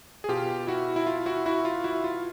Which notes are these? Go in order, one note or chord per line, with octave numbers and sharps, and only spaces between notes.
G#4
B2 F4 G4
E4 F#4
E4
F4
E4 F#4
E4 F#4
F4
E4 F#4
F4